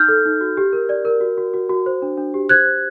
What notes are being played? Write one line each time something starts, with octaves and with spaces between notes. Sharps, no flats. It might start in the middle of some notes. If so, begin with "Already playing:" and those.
Already playing: D#4 F6 G6
A4
D#4
F#4
G4
A#4
D5
A#4
F#4
F#4
F#4
F#4
C5
D4
D4
G4
C5 F#6 G#6
C5